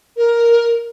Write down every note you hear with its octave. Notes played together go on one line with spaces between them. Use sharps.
A#4